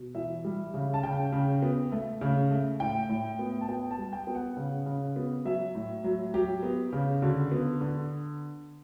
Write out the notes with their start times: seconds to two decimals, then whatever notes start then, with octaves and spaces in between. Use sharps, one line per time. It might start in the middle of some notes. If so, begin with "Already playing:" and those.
Already playing: B2
0.15 E3 E5
0.45 G3
0.74 C#3
0.94 A5
1.03 C#3 G5
1.32 C#3
1.62 B3
1.92 A3
2.21 C#3
2.51 A3
2.80 A2 G5
3.09 A2
3.39 B3
3.61 A5
3.69 B3 G5
3.91 A5
3.98 G3
4.13 G5
4.27 B3
4.35 F#5
4.57 C#3
4.86 C#3
5.16 B3
5.45 F#3 E5
5.75 A2
6.04 F#3
6.34 F#3 G4
6.63 B3
6.93 C#3
7.22 D3 F#4
7.52 B3
7.81 D3